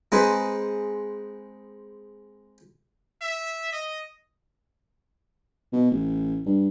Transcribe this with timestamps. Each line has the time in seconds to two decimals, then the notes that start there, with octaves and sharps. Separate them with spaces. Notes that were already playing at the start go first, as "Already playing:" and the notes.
0.12 G#3 C4 D#4 G#4 B4 C5
3.21 E5
3.72 D#5
5.73 B2
5.91 A1
6.46 G2